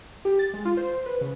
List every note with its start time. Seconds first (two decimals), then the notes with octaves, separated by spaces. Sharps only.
0.25 G4
0.39 A6
0.54 G#3
0.65 F4
0.77 C5
1.06 B4
1.21 C#3